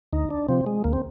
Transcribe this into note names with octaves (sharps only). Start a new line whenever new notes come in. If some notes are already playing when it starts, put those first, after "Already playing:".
D2 D#4
D4
C3 F3 C4
G#3
D2 A#3
C4